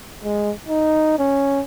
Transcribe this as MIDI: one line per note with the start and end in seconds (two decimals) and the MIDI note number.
0.24 0.51 56
0.69 1.16 63
1.19 1.62 61